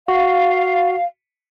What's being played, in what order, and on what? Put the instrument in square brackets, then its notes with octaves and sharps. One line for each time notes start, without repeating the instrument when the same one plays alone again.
[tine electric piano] F#4 [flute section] F5